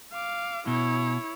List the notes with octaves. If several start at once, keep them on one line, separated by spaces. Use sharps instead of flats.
F5 D6
B2 E4 C#5